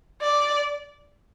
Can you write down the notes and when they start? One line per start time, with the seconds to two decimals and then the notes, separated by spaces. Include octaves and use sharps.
0.22 D5